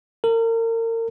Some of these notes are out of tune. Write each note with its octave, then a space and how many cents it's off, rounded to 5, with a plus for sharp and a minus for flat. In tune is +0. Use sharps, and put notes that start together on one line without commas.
A#4 -35